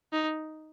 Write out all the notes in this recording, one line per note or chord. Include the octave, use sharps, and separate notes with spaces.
D#4